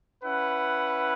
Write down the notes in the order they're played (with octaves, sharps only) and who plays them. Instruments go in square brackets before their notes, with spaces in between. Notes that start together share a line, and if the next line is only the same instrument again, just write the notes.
[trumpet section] C#4 E4 B4 F#5